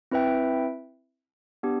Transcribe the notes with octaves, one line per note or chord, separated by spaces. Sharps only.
C4 E4 B4 E5 G5
B3 D4 G4